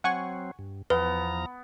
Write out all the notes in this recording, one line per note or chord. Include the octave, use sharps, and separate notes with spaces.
F#3 C4 F#5 G#5 C#6
G2
E2 F3 B3 B4 A#5